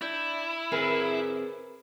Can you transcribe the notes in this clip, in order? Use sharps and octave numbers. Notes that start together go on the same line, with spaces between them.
D4 E4 G6
C4 G#4 A#4 B4